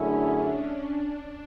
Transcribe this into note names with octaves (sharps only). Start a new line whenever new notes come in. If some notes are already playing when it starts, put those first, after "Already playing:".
Already playing: F#2 D3 A3 C#4 E4 G#4
D4
D4